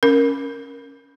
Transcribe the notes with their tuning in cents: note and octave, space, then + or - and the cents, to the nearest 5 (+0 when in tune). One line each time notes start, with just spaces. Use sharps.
C#4 +0 A#4 +0